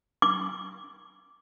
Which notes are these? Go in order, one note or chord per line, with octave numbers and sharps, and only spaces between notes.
D6